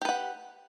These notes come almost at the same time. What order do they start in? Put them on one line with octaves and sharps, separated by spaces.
G4 B4 F#5